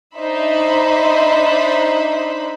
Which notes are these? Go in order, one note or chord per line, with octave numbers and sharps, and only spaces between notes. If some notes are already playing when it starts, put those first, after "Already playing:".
D4 D#4 C5 E5 B5